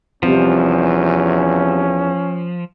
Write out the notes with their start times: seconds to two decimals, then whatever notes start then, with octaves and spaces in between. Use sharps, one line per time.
0.23 E2 C3 F3 G3 C#4